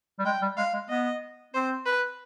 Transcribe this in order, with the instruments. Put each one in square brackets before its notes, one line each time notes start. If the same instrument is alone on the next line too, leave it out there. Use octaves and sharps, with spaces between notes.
[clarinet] G3
[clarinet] G#3 [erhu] G5
[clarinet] G3
[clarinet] G#3 [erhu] F5
[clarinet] G#3
[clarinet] B3 [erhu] D#5
[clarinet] C4 [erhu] C5
[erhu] B4